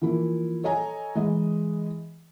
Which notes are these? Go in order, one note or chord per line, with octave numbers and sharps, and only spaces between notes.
E3 F3 A#3 E4
A4 C#5 D#5 G#5 A#5
E3 G#3 D#5